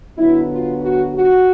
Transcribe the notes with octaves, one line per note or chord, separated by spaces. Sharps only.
D3 F#3 B3 E4
F4
F#4
F#4